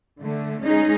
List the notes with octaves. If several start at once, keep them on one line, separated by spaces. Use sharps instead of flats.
D3 A3
G#3 C#4 D#4 G#4